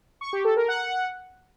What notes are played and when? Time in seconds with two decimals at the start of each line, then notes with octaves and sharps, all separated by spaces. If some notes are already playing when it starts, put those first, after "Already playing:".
0.21 C#6
0.33 G4
0.45 A4
0.56 A#4
0.68 F#5